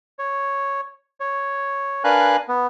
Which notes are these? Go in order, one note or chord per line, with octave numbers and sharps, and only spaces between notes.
C#5
C#5
D4 A#4 B4 F5 G#5 F#6
B3